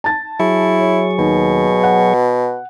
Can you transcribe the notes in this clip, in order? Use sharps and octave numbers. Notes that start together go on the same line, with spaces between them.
A5 A6
F#3 E4 G#4 C#6
C#5
D#2 B2
F#5